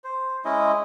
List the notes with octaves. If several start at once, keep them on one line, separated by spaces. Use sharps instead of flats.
C5
G#3 C#4 E4 D#5